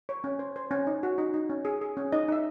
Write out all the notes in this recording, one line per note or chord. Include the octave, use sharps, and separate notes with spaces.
C#5
C#4
C5
C5
C#4
D#4
F#4
D#4
D#4
C#4
G#4
G#4
C#4
D#4 D#5
D#4 E5